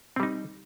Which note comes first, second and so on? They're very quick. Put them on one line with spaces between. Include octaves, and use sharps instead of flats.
C4 G3 D#4